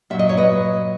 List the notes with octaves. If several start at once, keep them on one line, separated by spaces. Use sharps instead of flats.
A#2 F#3 E5
D#5
C#5
B4 D#5